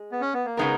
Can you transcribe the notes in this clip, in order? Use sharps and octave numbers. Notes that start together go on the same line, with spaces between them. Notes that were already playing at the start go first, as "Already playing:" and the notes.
Already playing: G#3
B3
C#4
B3
A#3
C#3 G#3 B3 D#4 A#4